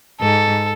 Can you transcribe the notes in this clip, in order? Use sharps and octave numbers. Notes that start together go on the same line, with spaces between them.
G#2 A4